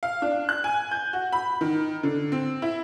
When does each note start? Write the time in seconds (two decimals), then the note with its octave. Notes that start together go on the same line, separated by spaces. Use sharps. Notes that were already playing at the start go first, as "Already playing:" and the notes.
0.03 F5
0.22 D4
0.49 F#6
0.64 G#5
0.91 G6
1.13 F#4
1.33 B5
1.61 D#3
2.03 D3
2.32 C4
2.62 E4